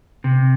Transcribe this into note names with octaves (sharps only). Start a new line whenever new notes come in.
C3